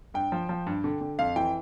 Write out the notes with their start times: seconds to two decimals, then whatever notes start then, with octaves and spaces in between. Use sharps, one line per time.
0.14 G2 G5
0.32 F3
0.49 F3
0.67 G2
0.84 D3
1.01 D3
1.19 F2 F5
1.36 E3 G5